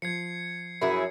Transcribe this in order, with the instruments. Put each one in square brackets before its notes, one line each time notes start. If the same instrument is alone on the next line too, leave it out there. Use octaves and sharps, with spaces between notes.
[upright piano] F3 [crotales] G#6 C7 C#7
[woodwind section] F#2 [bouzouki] E4 G#4